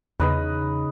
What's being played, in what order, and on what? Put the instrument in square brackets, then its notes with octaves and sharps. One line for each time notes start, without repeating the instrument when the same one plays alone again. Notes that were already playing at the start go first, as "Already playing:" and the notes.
[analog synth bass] E2 [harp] C#3 D#4 [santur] B4 D#5 B5